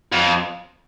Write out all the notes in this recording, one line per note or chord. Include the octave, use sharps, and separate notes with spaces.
F2